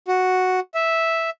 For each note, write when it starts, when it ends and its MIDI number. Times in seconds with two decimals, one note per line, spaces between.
0.08 0.60 66
0.74 1.30 76